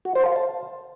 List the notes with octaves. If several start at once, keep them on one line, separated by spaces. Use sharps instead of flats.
F#4
C5
F5
A5